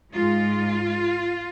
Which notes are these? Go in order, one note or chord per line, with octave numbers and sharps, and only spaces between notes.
G#2 G#3 F4